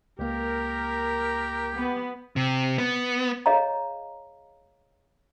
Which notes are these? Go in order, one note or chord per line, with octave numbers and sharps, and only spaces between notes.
C#2 A#3 G4 A#4
B3
C3
B3
G#4 C#5 D#5 F5 A#5